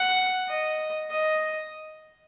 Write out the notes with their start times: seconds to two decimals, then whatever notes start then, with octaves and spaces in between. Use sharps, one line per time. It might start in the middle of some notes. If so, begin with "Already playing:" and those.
Already playing: F#5
0.48 D#5
1.11 D#5